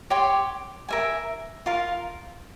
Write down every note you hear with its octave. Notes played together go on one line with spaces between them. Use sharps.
G4 C#5 G5 C6
A#4 E5 G#5
F4 A#4 F5